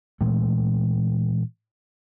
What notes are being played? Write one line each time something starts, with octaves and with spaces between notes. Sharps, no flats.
A#2 E3 G#3 A3